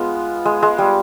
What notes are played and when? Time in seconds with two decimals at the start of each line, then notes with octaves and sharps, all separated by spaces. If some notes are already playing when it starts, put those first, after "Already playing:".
Already playing: G#3 B3 F4
0.45 G#3
0.63 G#3
0.78 G3